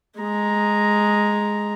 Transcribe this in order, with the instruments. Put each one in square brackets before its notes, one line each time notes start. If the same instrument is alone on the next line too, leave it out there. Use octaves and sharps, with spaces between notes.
[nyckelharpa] G#3 A#5